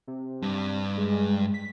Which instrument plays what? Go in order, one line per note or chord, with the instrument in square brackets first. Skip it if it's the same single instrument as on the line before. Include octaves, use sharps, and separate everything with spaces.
[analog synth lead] C3
[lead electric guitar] G2
[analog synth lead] G#3
B6